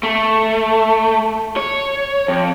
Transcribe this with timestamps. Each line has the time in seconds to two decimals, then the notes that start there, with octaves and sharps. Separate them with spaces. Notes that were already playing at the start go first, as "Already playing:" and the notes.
0.03 A3
1.57 C#5
2.28 F2